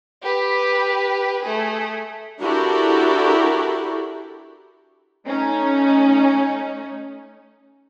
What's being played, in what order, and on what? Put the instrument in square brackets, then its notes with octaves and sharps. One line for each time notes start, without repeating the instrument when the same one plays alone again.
[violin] G4 B4
A3 G#4
[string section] D4 E4 F#4 G4 A4 A#4
A3 C#4 D#4